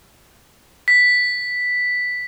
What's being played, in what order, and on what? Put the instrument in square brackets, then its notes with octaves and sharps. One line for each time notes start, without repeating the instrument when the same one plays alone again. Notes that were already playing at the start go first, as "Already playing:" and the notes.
[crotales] B6